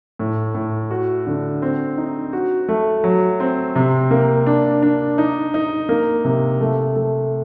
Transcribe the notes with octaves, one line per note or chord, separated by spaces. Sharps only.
A2
A2
F#4
D3
C4
D#4
F#4
A3
F#3
C4
C3
A#3
D4
D4
D#4
D#4
A#3
C3
A3
A3